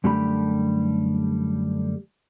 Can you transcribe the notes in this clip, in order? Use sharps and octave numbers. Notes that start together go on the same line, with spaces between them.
F#2 D3 G3 A3 G4 B5